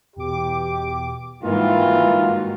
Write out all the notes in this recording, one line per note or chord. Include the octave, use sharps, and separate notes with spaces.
E2 B2 G4 D6
G#2 D#3 E3 G3 A#3 F4 F#4